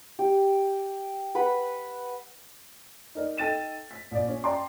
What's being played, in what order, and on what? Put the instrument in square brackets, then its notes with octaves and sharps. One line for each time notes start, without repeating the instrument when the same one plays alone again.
[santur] G4
B4 F#5 B5
[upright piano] D#4 A#4 D5
D#4 A4 G5 A6 D#7 E7
B6
A#1 D5
C#4
D5 G5 A5 A#5 C6 D6